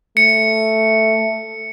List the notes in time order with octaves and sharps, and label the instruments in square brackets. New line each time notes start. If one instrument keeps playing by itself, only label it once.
[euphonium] A3 [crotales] C#7